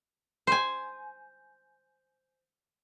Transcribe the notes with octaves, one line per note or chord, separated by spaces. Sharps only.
C5 G#5